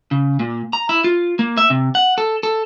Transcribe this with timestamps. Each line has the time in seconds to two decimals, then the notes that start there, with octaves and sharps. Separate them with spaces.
0.11 C#3
0.40 A#2
0.73 A#5
0.89 E4
1.04 F4
1.39 A#3
1.57 E5
1.70 C3
1.95 F#5
2.18 A4
2.43 A4